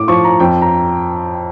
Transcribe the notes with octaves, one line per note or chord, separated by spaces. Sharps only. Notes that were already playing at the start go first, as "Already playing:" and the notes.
Already playing: A2 D6
F3 C#6
A#5
F2 G5
A#5